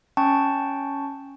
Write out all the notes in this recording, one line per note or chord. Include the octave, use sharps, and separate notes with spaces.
C#4 G5 A5 C#6